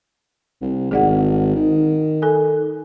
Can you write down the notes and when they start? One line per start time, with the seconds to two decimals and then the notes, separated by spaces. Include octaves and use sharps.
0.62 C2
0.91 G#1 G#4 D5 F#5
1.56 D#3
2.22 A4 G#5